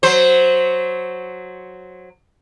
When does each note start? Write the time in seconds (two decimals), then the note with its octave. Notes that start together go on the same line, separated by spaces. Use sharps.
0.03 F#3 C5